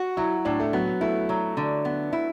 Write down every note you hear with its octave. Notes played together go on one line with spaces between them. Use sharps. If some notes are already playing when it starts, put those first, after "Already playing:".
Already playing: F#4
F#3 E4
A2 D4
A3
F#3 B3
A3 E4
F#3
D3
B3
E4